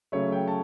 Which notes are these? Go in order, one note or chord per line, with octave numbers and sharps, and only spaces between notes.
C#3 F#3 A3 C#5
G5
A5